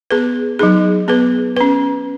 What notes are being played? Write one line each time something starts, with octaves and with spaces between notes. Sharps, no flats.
B3 G#4 B4
F#3 D#4 G#4
B3 G#4 B4
C#4 B4